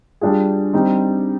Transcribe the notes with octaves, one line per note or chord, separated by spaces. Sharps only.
G3 D4 F4 G#4
G3 C4 D#4